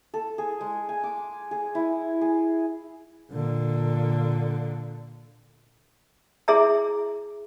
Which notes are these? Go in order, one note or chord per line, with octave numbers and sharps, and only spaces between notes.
A4
G#4
G#3
G#5
D6
G#4
E4
G#4
A#2 D3
E4 G#4 E5 A#5